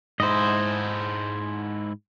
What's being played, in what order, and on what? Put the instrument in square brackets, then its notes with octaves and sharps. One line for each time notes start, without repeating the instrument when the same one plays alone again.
[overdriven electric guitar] G#2 E4 [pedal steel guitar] C5 D#5